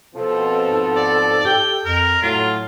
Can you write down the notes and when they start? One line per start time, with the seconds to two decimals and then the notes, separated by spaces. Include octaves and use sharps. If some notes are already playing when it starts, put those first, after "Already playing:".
0.15 B2 F3 C4 A4
0.65 G#2
0.96 D5
1.45 G4 G5
1.86 F2 A#4
2.22 A2 F#3 A3 F4